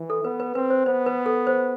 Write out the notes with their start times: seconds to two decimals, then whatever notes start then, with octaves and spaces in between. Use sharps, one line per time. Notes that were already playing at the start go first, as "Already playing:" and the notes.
Already playing: E3
0.10 A4
0.24 B3 B4
0.40 B4
0.55 C4 B4
0.70 C5
0.86 B3 C5
1.06 B4
1.26 A4
1.47 C5